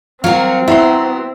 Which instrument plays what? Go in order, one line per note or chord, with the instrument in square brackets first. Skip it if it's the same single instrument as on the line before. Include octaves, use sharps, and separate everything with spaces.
[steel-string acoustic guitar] F#3 F#4 [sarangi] C4 [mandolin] A#4 F5
[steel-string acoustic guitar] B3 [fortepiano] E4 [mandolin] F#4 A#5 C6